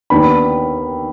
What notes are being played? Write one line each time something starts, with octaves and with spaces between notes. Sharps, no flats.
D#2 D#3 B3 D4 B5